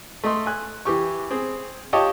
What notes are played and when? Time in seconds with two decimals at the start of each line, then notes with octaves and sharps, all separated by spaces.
0.24 A3 D#5 C6
0.46 G#5 F#6
0.85 E3 G4 C#6
1.30 C4 G#4
1.93 F4 G4 C#5 D#5 G5 A5